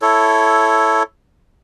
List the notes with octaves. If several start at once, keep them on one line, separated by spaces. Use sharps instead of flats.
E4 A4 C#5